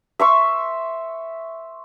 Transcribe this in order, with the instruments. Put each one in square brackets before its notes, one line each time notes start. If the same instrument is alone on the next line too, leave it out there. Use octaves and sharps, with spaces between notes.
[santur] E5 C6 C#6